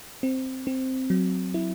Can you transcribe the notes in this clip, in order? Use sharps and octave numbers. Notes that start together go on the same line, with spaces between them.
C4
C4
F#3
E4